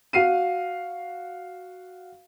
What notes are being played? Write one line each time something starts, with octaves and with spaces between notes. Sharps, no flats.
F#4 F5 C7 D#7